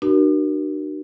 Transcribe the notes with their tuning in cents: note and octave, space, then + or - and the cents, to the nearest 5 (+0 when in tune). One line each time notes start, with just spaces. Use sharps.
D4 +45 F#4 +35 A#4 +25